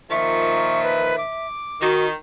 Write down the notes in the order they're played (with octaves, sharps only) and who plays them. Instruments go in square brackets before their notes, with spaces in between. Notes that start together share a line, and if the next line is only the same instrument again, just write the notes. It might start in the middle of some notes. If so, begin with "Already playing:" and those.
[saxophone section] A#2 D#3 F3 [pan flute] E5 [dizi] C#6
[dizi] B4
D6
[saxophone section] D#3 [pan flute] F#4